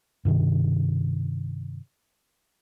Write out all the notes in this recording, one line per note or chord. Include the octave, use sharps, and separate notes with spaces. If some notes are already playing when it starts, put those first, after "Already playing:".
G2 C3 D#3